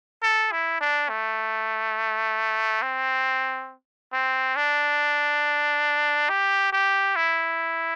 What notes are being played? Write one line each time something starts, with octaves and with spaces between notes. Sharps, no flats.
A4
E4
D4
A3
C4
C4
D4
G4
G4
E4